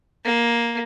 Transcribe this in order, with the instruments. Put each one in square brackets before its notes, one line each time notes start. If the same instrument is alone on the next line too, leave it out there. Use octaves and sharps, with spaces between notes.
[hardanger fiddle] A#3